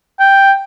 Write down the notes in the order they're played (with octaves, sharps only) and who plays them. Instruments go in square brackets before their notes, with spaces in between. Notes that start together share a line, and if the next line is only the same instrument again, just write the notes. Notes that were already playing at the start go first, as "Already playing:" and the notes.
[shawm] G5